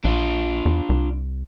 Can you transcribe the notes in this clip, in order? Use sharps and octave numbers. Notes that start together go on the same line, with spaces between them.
A#1 D4 F4
E2
C2